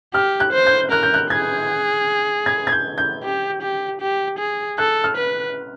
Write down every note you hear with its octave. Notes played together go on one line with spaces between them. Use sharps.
G4 F6
F#6
C5
G6
A#4 F#6
G6
F#6
G#4 G#6
G#6
G#6
G6
G6
G4
G4
G4
G#4
A4 F#6
F6
B4